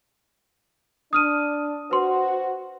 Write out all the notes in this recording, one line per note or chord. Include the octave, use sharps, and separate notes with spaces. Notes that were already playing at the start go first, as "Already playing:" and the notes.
D4 D#6 F6 D#7
F#4 B4 C5 C6